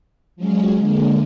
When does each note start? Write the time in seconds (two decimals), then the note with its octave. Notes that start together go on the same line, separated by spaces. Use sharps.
0.36 F3 F#3 G#3 C#4
0.79 D3 G#3 A#3